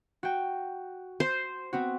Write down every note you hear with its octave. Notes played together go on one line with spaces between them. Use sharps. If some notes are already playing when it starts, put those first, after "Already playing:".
F#4 G5
C5
B3 C4 F#4